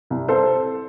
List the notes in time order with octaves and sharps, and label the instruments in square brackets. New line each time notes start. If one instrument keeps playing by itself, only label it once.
[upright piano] C2
A4 C5